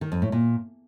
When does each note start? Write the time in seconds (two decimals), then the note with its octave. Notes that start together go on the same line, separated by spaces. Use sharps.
0.01 D#3
0.12 F2
0.22 A2
0.32 A#2